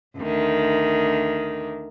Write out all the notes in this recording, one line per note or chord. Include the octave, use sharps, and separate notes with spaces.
D2 D#3